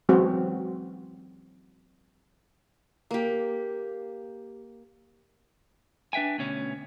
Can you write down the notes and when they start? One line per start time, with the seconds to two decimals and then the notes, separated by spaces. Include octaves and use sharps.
0.09 E3 F#3 G#3 C4 F#4 C5
3.11 A#3 G4
6.13 D4 B4 E5 G5 G#5
6.38 D2 B2 C#4